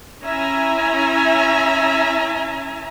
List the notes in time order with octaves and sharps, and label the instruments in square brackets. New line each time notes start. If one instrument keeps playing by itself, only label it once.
[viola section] C#4 E4 E5 G#5 A#5